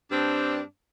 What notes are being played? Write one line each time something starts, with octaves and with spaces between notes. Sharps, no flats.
G2 C4 D4